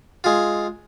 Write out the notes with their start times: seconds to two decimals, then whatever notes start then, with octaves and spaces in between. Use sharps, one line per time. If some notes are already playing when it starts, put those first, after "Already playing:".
0.24 G#3 F4